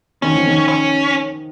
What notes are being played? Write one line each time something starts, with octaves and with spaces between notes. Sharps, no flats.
D#3 C#4
F3
D#3
C#4